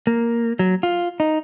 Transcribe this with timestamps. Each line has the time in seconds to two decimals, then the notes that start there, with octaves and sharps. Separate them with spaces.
0.07 A#3
0.59 F#3
0.83 F4
1.20 D#4